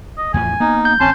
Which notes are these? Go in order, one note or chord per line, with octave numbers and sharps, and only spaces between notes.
D#5
E2 A2 F3 G#5
A#3 B3 D#4
G6
G#1 G#2 C4 C#4 A5 C6